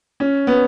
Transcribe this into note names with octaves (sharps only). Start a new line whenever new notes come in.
C#4
B3